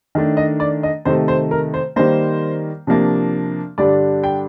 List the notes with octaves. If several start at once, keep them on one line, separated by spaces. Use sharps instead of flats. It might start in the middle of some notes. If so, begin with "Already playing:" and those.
D#3 A3 D4
D#5
D5
D#5
C3 D#3 A3 C5
C5
A#4
C5
D#3 G3 A#3 C5
C3 F3 A#3 D4
G2 D3 G3 D4 D5
G5